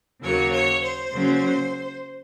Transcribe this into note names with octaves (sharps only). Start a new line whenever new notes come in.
D#2 C#3 F#3 A#3 C#5
C#5
C5
C#3 F#3 A#3 C#4